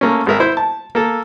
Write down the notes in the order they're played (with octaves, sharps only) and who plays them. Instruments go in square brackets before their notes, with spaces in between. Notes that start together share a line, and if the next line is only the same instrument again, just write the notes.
[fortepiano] A3 A#3 C#4
G#1 G#3 A#4 E5
E4 C5
A5
A#3 A4 E6